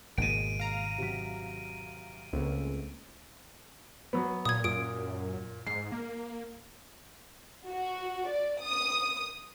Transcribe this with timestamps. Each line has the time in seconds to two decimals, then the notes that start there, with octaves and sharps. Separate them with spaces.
0.18 G#1 B2 G#3 A#3 D7 D#7
0.60 F5 A#5
0.98 C3 F#3 B6
2.33 C#2 C#3 A3 A#3 C4
4.13 F#3 B3
4.45 A#2 D#6 G#6
4.64 F#2 A#2 D#6 D7
5.67 G#2 C7
5.92 A#3
7.68 F#4
8.27 D5
8.61 D#6